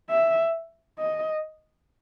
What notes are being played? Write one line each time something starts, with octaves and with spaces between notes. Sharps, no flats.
E5
D#5